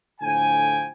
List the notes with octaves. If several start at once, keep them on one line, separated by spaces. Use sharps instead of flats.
A2 D3 F3 G5 G#5